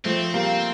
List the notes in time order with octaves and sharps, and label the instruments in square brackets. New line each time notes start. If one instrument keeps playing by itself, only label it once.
[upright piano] F3 A3 [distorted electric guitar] C4
[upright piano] G3 A#3